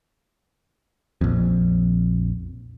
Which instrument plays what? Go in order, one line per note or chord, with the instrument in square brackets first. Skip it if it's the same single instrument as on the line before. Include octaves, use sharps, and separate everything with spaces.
[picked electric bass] A#1 F2